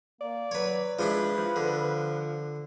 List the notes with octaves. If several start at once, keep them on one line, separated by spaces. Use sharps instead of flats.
A#3 D5
F#3 B4 C#5
F3 G#3 D4 E4 B4
F3
D3